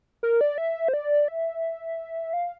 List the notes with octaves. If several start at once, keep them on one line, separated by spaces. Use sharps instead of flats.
A#4
D5
E5
C5
D5
E5
F5